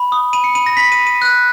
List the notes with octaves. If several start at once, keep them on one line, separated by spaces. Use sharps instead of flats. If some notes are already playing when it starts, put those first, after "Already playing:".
Already playing: B5
D#6
B5 D#7
C#7
B5 D#7
A#6
B5 B6
D#7
B5
D#7
F#6